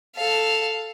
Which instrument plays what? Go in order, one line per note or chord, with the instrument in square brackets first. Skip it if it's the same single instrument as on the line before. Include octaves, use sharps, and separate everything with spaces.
[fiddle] A4 F5